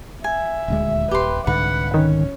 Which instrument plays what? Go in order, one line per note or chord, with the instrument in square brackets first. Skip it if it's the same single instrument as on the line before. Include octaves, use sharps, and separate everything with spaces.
[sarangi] E5 [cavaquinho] G#5
[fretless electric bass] D#1 D2 G#3
[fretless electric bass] D#1 [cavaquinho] G4 C6 [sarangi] B4
[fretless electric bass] C2 G#2 D3 [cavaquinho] B4 [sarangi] F#5
[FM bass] D#3 [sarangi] C#4